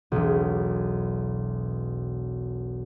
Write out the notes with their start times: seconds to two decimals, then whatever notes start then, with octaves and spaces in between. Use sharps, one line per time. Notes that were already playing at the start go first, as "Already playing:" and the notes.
0.12 E1 B1